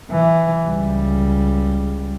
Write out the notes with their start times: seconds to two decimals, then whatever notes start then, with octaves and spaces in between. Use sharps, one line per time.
0.11 E3
0.66 C#2 G3